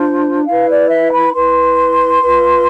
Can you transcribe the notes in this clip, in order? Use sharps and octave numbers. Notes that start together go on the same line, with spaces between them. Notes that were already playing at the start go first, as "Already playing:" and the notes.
Already playing: D4 F4 C5
E4 B4 F5
D5
E5
B5
E4 B4 C6
F4 B4